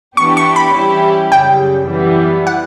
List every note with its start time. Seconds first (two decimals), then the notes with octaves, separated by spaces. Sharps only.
0.17 E3 B3 D4 G4 C#6
0.37 C#6
0.56 B5
0.74 E3 G3 C#4 E4 G4
1.32 F#2 C#3 G3 G5
1.90 E3 G3 B3
2.47 F#5